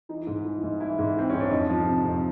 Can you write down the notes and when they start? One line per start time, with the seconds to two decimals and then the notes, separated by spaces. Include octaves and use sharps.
0.09 E3 D#4
0.27 G#2
0.45 E3
0.63 G#2
0.80 E3 E4
0.99 G#2
1.16 E3 C4
1.30 G#2 C#4
1.40 D4
1.51 F2 D#4
1.69 F3
1.86 C3
2.04 F2